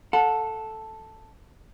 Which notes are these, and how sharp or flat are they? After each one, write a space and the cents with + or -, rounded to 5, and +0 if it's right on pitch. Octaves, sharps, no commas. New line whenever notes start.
A4 +0 F#5 -30